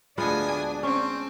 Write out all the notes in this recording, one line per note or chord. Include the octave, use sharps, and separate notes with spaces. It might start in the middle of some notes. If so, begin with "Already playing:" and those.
D2 G#3 B3 D4 F4 G#5 D#6
C4 C#4